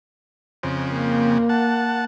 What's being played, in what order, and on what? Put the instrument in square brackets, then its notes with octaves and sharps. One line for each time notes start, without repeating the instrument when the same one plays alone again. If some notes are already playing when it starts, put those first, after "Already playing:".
[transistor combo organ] F2 C#3 C4
[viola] A#3
[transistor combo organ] F#5 A5